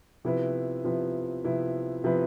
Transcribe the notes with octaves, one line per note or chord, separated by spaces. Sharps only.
C3 F3 B3 E4 B4
C3 F3 B3 E4 B4
C3 F3 B3 E4 B4
C3 F3 B3 E4 B4